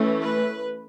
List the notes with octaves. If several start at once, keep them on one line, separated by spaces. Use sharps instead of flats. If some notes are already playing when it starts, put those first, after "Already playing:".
Already playing: E3 A3 C#4
B4